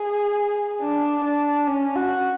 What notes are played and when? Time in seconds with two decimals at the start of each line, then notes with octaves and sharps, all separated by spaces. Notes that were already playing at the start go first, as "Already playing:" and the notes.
Already playing: G#4
0.82 D4
1.24 D4
1.67 C#4
1.95 F#4